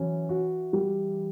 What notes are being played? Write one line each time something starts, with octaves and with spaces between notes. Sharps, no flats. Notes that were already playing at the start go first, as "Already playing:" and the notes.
Already playing: E3 F#3 C#4
F#4
G3